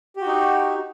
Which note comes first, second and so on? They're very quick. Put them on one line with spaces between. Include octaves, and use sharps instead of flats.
G4 F#4 D#4